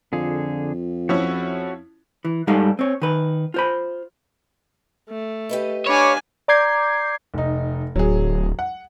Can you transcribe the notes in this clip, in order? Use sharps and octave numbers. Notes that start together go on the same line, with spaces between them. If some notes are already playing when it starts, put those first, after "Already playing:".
F2 D3 F4 G#4
F3 C#4 E4 F#4
E3
G2 G3 G#3 D#4 A4 F5
C4 C#5
D#3 B4
F4 C5 B5
A3
G4 B4 D#5
D4 C#5 F5 G#5 B5 D6
D5 A#5 D6 G6 G#6 C7
F1 D#4
D1 F#3 G#4
F#5